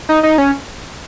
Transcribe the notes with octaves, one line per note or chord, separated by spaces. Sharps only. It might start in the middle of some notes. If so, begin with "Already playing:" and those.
D#4
D#4
C#4